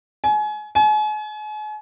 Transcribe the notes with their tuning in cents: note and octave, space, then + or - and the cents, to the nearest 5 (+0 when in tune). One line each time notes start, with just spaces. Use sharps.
G#5 +30
G#5 +40